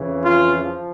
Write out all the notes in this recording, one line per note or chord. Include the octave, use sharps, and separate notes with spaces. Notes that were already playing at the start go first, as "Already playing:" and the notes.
Already playing: F2 C#3 E3
F4
F3